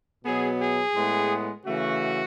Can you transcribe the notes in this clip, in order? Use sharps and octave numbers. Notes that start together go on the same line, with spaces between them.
B2 F#3 B3 G#4
G#4
A2 G#3 B3
C#3 E3 A3 F#4